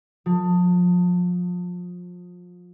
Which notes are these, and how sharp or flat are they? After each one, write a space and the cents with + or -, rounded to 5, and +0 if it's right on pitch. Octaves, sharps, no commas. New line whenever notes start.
F3 +30